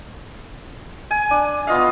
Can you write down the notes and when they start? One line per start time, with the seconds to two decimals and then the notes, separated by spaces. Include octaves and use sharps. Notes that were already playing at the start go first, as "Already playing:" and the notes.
1.11 G#5
1.31 D4
1.67 B3 F4 D#5 F5